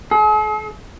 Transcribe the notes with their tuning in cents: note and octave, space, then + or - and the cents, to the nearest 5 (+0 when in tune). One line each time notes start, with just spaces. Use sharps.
G#4 +45